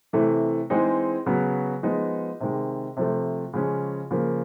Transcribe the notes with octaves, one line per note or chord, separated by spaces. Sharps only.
C3 E3 A3
E3 G#3 C4 D#4 G#4
C#3 F#3 B3
F3 G#3 B3 D#4
C3 D#3 G#3
C3 F3 A3
C#3 F3 G#3 C#4
C#3 F3 A#3